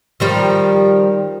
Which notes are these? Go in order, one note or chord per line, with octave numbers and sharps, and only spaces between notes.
D#3 F3 G3